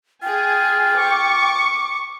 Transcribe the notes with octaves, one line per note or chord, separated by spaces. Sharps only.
F4 G#4 G5 G#5
C#6 D6